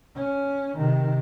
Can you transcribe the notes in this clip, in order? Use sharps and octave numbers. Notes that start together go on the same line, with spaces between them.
C#4
C3 D#3